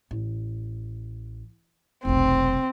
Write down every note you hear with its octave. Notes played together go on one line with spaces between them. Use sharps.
A1
F1 B1 C4